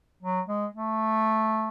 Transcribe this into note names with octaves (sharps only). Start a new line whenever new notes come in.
F#3
G#3
A3